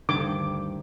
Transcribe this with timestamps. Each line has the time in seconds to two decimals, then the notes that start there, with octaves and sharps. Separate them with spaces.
0.09 D2 G2 D3 D#3 D6